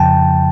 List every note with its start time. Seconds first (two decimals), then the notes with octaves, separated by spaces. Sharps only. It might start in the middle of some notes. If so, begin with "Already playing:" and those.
Already playing: F2 C#3 F3 G5 A5